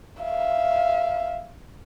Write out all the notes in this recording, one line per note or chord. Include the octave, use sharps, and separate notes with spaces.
E5 F5